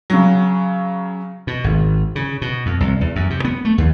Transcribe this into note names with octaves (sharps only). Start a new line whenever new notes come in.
C#3 F#3
B2
G#1
C#3
B2
F2
C2
E2
F#2
C3
B3
A3
D#2